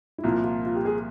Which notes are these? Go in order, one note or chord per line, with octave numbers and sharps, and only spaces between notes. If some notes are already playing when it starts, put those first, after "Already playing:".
E4
C2 A#2 F3 A#3 F4
F4
F4
G4
G#4